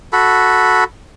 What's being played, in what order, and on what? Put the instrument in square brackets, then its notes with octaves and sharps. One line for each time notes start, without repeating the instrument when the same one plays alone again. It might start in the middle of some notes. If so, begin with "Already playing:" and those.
[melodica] F#4 A4 B5